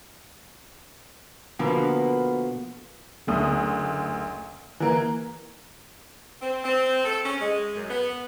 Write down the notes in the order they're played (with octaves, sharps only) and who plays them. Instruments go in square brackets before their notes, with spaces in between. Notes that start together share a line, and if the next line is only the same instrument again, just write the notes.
[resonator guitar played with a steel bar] B2 D3 F3 A#3 B3
[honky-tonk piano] F#1 D2 D#6
E3 A#3
[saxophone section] C4
C4
A4
C#4
G#3
F#2
B3